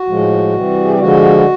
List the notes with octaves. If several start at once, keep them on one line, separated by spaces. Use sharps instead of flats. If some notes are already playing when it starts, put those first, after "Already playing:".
Already playing: F#4
A2 F3 G#3
C3 E3 G3
G#4
G4
D3 F3 G#3 F#4